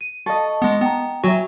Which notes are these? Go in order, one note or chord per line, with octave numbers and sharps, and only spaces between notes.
D#7
A4 D#5 F5 A5 C#6
G#3 B3
B3 G5 A#5
F#3 F#4 E5 G#5